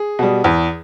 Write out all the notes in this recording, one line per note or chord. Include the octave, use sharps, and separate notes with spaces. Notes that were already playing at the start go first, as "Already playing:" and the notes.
Already playing: G#4
B2 G3
E2